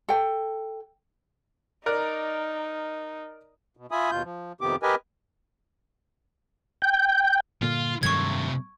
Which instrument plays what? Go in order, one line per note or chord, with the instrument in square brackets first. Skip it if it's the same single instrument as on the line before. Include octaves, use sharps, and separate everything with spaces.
[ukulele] A4 G5
[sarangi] D#4 [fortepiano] A#4 D5 F#6
[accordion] B2
F4 E5 G#5 B5 D#6
D#2 B2 F4 G6
F3
F2 C3 D#3 B3 G4 D6
G4 A#4 B4 D#5 G#5
[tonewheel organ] G5
[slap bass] G2 A#2 D3 [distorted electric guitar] F4
[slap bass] G2 D#3 F#3 [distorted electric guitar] C3 A3 [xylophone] C#6 G#6